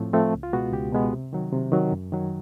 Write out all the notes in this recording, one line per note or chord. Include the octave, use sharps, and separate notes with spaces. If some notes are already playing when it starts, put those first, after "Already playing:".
Already playing: A2 F3 A3 C4
F3 A3 C4
C#2
F4
B2 G#3 B3 F#4
C#2 G4
B2 G#3 B3
C3
D#3 F#3
C3
D#3 F#3
F#2
D#3 F#3